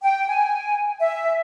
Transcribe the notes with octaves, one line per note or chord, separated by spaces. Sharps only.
G5
G#5
E5